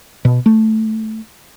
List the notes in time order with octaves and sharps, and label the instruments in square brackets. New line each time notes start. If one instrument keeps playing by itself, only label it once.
[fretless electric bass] B2
A3